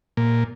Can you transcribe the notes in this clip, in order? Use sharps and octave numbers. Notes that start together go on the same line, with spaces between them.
A#2